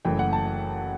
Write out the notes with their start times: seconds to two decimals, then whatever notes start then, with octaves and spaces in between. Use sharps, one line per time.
0.05 F#1 F#2 E3 A3 G5
0.19 F#5
0.33 A5